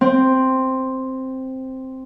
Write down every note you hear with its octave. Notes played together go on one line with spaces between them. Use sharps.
C4